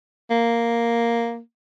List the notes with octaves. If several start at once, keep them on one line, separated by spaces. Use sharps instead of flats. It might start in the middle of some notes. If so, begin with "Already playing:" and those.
A#3